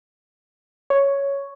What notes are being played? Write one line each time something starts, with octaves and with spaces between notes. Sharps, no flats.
C#5